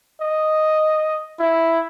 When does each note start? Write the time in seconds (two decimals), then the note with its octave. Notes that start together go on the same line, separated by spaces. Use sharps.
0.22 D#5
1.39 E4